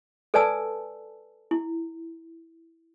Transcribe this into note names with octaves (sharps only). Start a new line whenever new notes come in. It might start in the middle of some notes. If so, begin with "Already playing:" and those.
A4 B4 D5 G#5 A5 E6
E4